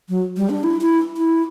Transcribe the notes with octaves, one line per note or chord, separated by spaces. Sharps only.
F#3
G3
D4
E4
E4
E4